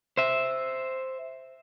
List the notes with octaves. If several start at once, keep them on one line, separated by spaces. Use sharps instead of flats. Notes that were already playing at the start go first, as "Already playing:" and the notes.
C5 E5